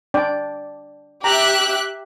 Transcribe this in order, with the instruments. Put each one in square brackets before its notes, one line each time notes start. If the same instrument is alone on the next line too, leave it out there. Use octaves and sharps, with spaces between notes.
[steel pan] D4 D5 G5
[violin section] G4 E5 F#6 [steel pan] A#5